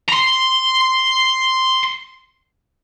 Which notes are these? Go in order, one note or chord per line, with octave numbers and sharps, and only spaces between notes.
A#5 C6